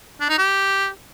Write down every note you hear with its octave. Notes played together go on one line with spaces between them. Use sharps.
D4
D#4
G4